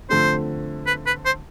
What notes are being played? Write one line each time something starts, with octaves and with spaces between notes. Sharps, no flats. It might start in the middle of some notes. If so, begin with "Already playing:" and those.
D3 F3 A3 C4 C5
B4
B4
C5